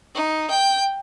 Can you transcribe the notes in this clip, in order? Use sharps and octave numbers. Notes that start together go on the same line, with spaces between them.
D#4
G5